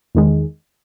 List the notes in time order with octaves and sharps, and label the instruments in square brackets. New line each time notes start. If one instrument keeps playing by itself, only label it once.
[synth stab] E2 D#3 G#3